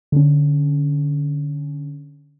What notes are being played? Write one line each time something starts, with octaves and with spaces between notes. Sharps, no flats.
D3 C#4